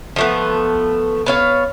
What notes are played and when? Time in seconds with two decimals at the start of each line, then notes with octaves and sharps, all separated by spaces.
0.16 F3 A3 B3
1.26 B3 C#5 F5